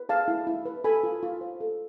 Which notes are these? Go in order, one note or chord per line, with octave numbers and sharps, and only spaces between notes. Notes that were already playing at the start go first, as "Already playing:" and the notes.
Already playing: B4
G#4 F5 A5
E4
E4
B4
A4 G#5 B5
F4
F4
C5
A4